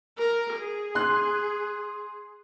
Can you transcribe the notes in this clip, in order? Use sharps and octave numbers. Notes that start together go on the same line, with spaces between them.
A#4
G#4
C6 F#6